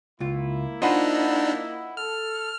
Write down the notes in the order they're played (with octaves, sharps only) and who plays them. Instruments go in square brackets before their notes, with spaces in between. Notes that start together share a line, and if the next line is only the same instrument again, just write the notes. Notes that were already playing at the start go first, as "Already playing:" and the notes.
[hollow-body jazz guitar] C#2 F4 [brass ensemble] A#3 E4
[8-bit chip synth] D4 D#4 [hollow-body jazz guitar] F4 C5 [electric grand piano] D#5 F#5 B5
[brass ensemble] A4 [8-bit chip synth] F6